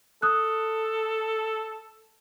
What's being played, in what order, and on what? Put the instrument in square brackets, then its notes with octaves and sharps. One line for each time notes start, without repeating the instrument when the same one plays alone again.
[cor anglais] A4 [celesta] D#6 F#6